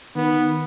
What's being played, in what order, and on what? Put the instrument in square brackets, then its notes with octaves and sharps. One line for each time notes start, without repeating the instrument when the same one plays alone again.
[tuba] D#3 [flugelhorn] B3